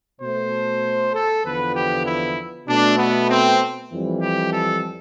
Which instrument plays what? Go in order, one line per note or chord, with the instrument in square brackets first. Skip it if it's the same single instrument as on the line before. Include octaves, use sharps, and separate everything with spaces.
[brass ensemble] B2 A3 C5
A4
E2 D3 F3 B3 B4
G4
E4
B2 A3 D4
B3
C4
F2 E3 G3
G4
A4